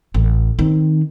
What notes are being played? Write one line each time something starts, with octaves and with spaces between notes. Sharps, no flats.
A1
D#3 C4